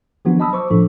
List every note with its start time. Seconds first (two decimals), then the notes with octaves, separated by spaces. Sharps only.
0.25 D#3 F3 F#3 B3 D4 F#4
0.40 D#5 A5 B5 D#6 E6
0.53 C5 C#6 D6 E6
0.71 A2 F3 D4 A4